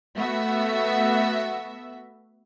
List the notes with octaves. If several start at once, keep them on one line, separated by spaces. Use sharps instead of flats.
A3 B3 F#4 E5